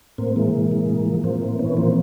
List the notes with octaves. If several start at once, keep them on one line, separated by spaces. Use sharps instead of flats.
A2 A#3 C4
E3 G#3 A#3
C3
E3
A2
F3
A2 A#3 C4
E3
A#2 B3 C#4
F3 A#3 C4